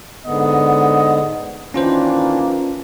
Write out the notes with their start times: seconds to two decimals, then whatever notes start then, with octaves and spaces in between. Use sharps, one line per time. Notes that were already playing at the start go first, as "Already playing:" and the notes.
0.26 G#2 D3 B3 D#5
1.74 D#3 E3 A#3 C#4 D4 F4 C5